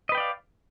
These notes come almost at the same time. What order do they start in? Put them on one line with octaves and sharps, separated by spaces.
D#5 B4 G5 D5 F5